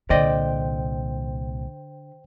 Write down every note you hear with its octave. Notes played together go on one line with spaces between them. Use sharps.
C2 A#2 D3 C5 D5 D#5 G5